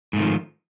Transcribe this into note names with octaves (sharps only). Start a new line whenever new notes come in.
G#2 D#3 F3 A3